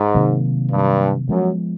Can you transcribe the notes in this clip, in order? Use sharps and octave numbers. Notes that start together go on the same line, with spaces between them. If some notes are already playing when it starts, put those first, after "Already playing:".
Already playing: G#2
C3 D#3 F#3 A#3
G2
F#2 F3 G#3 B3